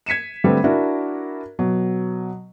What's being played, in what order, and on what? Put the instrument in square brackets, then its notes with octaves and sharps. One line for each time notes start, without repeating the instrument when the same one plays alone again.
[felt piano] G#6 B6 C#7 D#7 E7
D3 G3 A3 C4 B4
D4 E4 F#4 A#4
B2 F#3